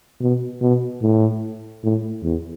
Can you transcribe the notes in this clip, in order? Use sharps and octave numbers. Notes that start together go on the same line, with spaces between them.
B2
B2
A2
A2
E2